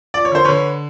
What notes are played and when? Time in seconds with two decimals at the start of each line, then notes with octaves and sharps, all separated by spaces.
0.14 F3 D5
0.25 C#5
0.32 D3 C5
0.45 D3 B4 C#5